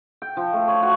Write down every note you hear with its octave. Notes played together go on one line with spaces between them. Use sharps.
G5
F3
A3
C#5
F#4